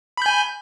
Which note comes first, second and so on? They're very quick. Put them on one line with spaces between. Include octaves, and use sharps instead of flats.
B5 G6 G#5